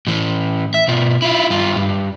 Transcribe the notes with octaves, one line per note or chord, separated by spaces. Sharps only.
A2 E3
E5
B2 F4
E4 F4
G2 F4
G2